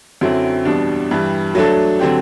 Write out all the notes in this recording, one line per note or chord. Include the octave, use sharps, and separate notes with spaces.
F#2 D3 F#3 C4 E4
E2 B2 G3 D4
G2 E3 G3
F#3 A3 D4 A4
D3 F#3 C4 G4